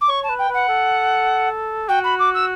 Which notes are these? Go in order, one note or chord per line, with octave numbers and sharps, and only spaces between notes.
D6
C#5 C#6
A5
B4
G5
B4 F#5
A4
F#4 G5
B5
D6
E6